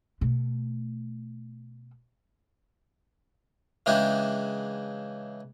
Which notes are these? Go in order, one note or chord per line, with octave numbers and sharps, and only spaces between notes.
B2 A3
C#3 E3 G#3 D4 E4 G4